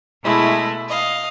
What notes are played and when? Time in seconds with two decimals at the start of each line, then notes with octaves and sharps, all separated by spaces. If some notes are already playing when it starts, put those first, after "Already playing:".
0.22 B2 G#3 A3 E4
0.88 D#5 F5